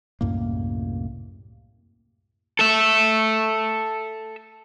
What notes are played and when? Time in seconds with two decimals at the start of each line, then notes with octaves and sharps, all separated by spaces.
0.21 C2 F#2 A2 A#3
2.59 A4 E5